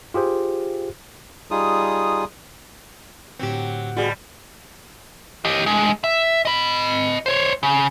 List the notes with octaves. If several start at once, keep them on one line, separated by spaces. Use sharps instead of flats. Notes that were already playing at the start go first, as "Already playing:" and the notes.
F4 G4 G#4 C5
G3 D#4 F4 G#4 D#6
A2 D3 F#3 C4 G4
B2 G3 F#4 G#4
G4 D#5
G#3 D4
E5
D#5 B5
C5 C#5
C#3